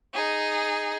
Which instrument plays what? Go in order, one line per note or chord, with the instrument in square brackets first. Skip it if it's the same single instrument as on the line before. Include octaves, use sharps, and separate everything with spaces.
[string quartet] D#4 G#4